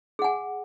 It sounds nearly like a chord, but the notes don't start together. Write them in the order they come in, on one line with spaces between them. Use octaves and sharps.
G#4 F#5 G#5